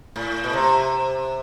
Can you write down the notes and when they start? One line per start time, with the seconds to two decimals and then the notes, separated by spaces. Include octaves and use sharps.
0.16 A2
0.44 B2
0.53 C3